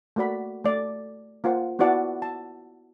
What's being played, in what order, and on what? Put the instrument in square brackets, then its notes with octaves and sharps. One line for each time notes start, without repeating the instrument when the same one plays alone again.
[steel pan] A3 A#3 F#4 D5 B5
A3 D5
A#3 F4 C5 F#5
B3 E4 F#4 D5 F#5 A5
A5